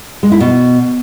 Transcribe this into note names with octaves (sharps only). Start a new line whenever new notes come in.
G#3
E4
B2